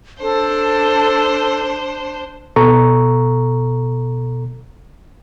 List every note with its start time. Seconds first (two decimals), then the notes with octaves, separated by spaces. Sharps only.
0.22 D4 A4 C5
2.56 B2 A4 A#5 C#6